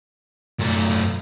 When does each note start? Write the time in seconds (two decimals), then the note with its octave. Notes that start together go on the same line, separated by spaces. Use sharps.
0.60 F#2 A3